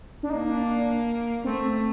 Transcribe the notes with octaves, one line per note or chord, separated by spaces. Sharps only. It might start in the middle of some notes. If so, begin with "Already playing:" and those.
D4
A#3 D#4
D4
A3 C4